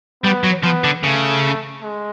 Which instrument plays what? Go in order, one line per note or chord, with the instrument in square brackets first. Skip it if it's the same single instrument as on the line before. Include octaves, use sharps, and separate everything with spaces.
[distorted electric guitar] G3 [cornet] B3
[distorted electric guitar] F#3
[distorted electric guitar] F3 [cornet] B3
[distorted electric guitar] D3
[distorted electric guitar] C#3 [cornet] A3
[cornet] G#3